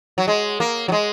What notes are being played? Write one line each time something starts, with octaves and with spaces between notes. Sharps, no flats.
F#3
G#3
A#3
F#3
G#3